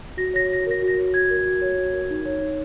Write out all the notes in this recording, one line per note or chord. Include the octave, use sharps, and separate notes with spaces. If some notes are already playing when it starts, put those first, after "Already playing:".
F#4 A#6
C#5 A#6
F#4 A#6
A#4 A#6
F#4
A#6
C#5
F#4 G#6
A#4
F#4
C#5
F#4
A#4
D#4
C#5
D#4